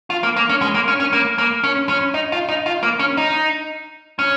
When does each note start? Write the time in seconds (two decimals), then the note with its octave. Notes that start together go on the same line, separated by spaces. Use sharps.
0.10 F4
0.23 A#3
0.37 A#3
0.49 C#4
0.62 G#3
0.75 A#3
0.88 C#4
1.00 C#4
1.13 A#3
1.38 A#3
1.64 C#4
1.89 C#4
2.14 D#4
2.32 F4
2.49 D#4
2.66 F4
2.83 A#3
2.99 C#4
3.17 D#4
4.19 C#4